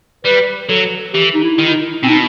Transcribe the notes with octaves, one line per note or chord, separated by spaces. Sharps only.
G3 B4
F#3 A4
E3 G4
D#4
E4
D#3
E4
D#4
B2 C4
D#4